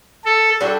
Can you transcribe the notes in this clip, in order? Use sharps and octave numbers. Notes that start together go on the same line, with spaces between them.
A4
G3 D4 F#4 A4